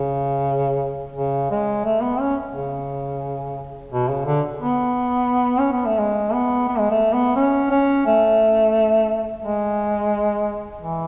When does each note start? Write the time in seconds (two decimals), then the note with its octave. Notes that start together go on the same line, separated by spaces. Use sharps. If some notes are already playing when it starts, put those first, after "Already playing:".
Already playing: C#3
1.16 C#3
1.51 G#3
1.85 A3
2.02 B3
2.20 C#4
2.53 C#3
3.91 B2
4.09 C#3
4.26 D3
4.60 B3
5.60 C#4
5.73 B3
5.86 A3
5.99 G#3
6.33 B3
6.68 B3
6.79 G#3
6.91 A3
7.13 B3
7.36 C#4
7.71 C#4
8.06 A3
9.43 G#3
10.82 E3